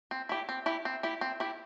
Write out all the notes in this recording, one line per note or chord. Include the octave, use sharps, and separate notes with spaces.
C4
E4 G4
C4
E4 G4
C4
E4 G4
C4
E4 G4